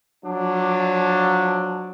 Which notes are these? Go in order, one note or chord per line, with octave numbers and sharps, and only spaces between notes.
F3 F#3 D4